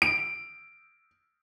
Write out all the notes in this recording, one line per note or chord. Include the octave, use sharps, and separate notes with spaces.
D7